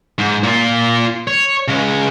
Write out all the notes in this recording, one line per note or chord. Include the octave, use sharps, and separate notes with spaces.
G#2
A#2 F4
C#5
C#3 G#3